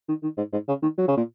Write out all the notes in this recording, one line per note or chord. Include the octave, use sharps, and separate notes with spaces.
D#3
D#3
G#2
G#2
C#3
D#3
F#3
C#3
A#2